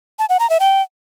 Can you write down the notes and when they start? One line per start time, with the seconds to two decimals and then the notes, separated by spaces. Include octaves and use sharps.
0.19 A5
0.29 F#5
0.40 A#5
0.50 E5
0.60 G5